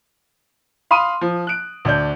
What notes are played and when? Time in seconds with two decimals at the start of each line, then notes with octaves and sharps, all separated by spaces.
0.91 F5 B5 C6 D#6 D#7
1.21 F3
1.47 F#6 D7
1.85 D2 D4 G6